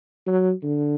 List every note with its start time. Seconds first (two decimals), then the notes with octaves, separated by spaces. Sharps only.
0.27 F#3
0.63 D3